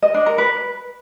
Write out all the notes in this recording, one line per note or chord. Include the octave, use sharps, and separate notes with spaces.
D#5
D4
A#4
B4